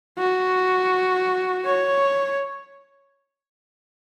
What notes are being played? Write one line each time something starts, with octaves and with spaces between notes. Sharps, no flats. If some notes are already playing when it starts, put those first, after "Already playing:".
F#4
C#5